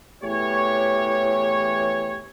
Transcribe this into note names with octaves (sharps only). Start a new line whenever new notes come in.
E2 A2 E3 G4 C#5